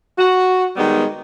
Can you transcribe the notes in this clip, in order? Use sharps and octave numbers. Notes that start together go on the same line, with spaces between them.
F#4
D#3 G3 G#3 B3